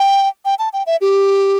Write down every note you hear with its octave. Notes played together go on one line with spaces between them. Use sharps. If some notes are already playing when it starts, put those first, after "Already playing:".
Already playing: G5
G5
A5
G5
E5
G4